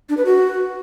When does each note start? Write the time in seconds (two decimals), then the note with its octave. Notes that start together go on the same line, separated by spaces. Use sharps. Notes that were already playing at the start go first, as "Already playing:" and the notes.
0.09 D4
0.17 B4
0.25 F#4